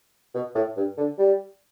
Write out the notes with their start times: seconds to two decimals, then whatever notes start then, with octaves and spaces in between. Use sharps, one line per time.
0.34 B2
0.55 A2
0.76 G2
0.97 D3
1.18 G3